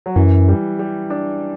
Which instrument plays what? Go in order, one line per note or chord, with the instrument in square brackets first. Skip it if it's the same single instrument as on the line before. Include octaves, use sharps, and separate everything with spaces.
[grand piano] F#3
[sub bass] F#2 [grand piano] E3
[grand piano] G3
G3
D4